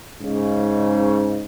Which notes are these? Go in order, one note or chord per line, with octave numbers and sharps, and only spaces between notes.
G#2 C#3